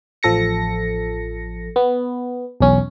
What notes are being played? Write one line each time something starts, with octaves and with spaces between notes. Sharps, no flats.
A1 F3 A4 A#6 C#7
B3
B1 E2 C#4